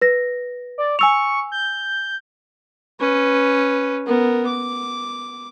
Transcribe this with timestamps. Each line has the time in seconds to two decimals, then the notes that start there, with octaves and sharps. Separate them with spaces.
0.02 B4 A#6
0.78 D5
0.99 G#5 C#6 E6 F7
1.52 G6
3.00 C#4 B4
4.06 B3 A#4
4.46 D6